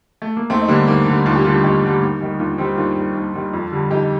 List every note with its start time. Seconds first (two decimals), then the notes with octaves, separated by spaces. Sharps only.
0.22 A3
0.37 A#3
0.50 D#2 A3 C4
0.62 D#4
0.68 D3 G3 A#3 D4
0.88 D#2 A#3
1.06 D3 G3
1.26 D#2 D4 F4
1.35 G4
1.44 D3 G3 D4 F4
1.64 D#2 D#4 G4
1.82 D3 G3
2.02 D#2
2.21 D#3 G3
2.40 D#2 D4 F4
2.58 D#3 G3 C4 D#4
2.77 D#2 D4 F4
2.96 D#3 G3
3.15 D#2
3.34 D#3 G3
3.53 F2
3.72 D3 G3
3.91 F2 D#4 G4